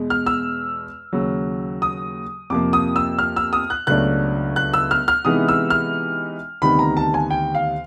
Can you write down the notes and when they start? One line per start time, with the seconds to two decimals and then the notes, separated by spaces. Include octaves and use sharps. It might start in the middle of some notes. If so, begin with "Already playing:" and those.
Already playing: E2 B2 G#3
0.10 F6
0.26 E6
1.13 D#2 C#3 F#3
1.82 D#6
2.50 F2 C3 F3 A#3 D6
2.73 D#6
2.96 E6
3.19 F6
3.36 E6
3.53 D#6
3.70 F#6
3.87 C#2 B2 F#3 A3 D4 F#6
4.56 F#6
4.74 E6
4.91 F6
5.08 F6
5.25 C3 E3 G#3 B3 D#4 D#6
5.49 E6
5.70 F6
6.62 D2 C3 D#3 G3 B3 B5
6.79 A#5
6.97 A5
7.14 G#5
7.31 G5
7.55 F5